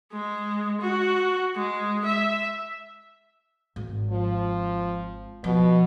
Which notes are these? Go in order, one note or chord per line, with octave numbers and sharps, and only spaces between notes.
G#3
F#4
G#3
E5
G#1
F3
B2 F3